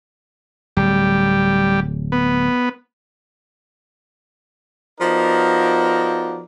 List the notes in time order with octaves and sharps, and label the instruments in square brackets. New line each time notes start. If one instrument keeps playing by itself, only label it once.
[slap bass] D1 [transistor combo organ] G3
[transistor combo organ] B3
[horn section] F3 B3 D#4 F#4 A#4 D5